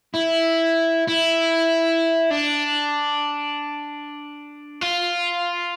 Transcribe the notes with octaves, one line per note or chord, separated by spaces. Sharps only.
E4
E4
D4
F4